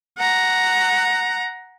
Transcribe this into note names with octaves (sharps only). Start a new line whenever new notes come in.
F#5 A#5